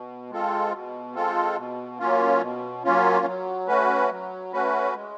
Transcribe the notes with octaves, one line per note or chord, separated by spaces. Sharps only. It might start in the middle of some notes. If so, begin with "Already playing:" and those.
Already playing: B2
G#3 C4 F4 A4
B2
G#3 C4 F4 A4
B2
F#3 A#3 C#4 F4
B2
F#3 A#3 C#4 F4
F#3
A3 C#4 F#4 B4
F#3
A3 C#4 F#4 B4
G#3